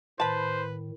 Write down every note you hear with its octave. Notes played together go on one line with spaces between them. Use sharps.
A2 D#3 B4 C5 A5 B5